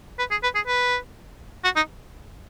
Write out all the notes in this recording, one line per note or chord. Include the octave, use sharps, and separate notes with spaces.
B4
G#4
B4
G#4
B4
F#4
D#4